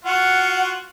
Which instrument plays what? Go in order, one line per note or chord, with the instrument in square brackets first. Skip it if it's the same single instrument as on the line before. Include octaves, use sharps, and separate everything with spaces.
[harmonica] F4 F#4 [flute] F#5